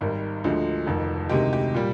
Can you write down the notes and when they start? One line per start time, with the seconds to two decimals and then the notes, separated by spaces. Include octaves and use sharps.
0.01 G#1 G#2 G3 A#4
0.44 D2 D3 F3 G#3
0.87 F1 F2 D#3
1.29 D2 C3 D#3 G#3 G4
1.53 G4
1.75 A#2 G3